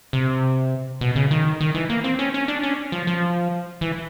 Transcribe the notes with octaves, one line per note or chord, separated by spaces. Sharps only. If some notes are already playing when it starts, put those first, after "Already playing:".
C3
B2
C#3
D#3
D#3
E3
A#3
C4
C#4
C#4
D4
C#4
F3
F3
E3